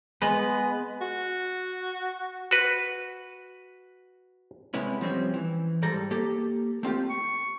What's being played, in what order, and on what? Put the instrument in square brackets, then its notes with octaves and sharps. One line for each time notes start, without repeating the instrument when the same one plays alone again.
[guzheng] G#3 [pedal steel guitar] B3 B4 [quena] G#5
[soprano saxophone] F#4
[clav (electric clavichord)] F#4 B4
[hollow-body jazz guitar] C3 G#3 B3 C#4 E4
F3 G3 C4 C#4
E3
G#2 G3 A4 A#5
A#3 G4 A4
A3 C4 F4 G4
[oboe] C#6